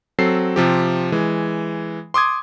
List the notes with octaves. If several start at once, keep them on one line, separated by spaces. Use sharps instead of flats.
F#3 C4 A4 C7
C3 F3 G4
E3 G#3
C6 D6 D#6 G#6